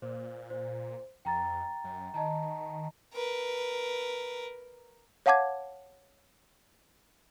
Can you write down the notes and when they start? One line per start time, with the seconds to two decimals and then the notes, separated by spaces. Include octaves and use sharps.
0.02 A#2 C5
0.50 C5
1.25 F2 G5 A#5 A6
1.84 F#2
2.14 D#3 D#5 A5 A#5
3.14 A#4 B4
5.26 C#5 F5 F#5 A5 D6 G#6